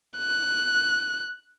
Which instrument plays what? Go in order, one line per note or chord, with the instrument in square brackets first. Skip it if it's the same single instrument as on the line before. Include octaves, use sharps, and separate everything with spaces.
[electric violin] F#6